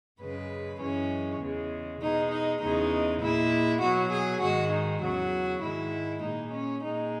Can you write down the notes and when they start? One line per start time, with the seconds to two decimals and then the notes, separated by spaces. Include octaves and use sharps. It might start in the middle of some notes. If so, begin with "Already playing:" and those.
0.21 F#2 C#3 G#3 B4
0.81 F#2 E3 G#3 C#4
1.41 E2 C#3 G#3
2.01 B2 G#3 D#4
2.32 D#4
2.62 E2 C#3 G#3 D#4
3.22 A#2 G#3 E4
3.82 B2 F#3 F#4
4.12 G#4
4.42 G#2 D#3 G#3 F#4
4.73 D#4
5.03 E2 C#3 F#3 F#4
5.63 G#2 D#3 G#3 E4
6.23 A#2 G#3 D#4
6.54 C#4
6.83 A#2 G#3 D#4